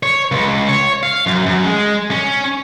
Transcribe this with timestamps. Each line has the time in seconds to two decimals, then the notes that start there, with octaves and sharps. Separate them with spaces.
0.03 C#5
0.32 C#2
0.69 C#5
1.03 F5
1.27 F#2
1.46 F#2
1.65 G#3
2.11 C#4